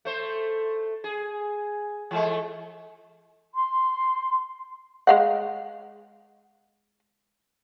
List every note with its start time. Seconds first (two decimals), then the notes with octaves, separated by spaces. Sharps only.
0.05 A3 C5
1.04 G#4
2.11 E3 G#3 A3
3.55 C6
5.07 G#3 F5 F#5